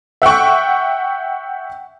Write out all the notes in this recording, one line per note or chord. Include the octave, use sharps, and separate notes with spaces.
E5 F#5 G5 C#6